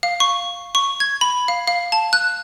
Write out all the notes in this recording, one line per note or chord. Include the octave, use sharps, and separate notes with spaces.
F5
C#6
C#6
G#6
B5
F5
F5
A5
F#6